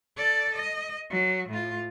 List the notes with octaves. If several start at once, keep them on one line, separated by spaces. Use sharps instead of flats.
A4 D5
D#5
F#3
A2 F4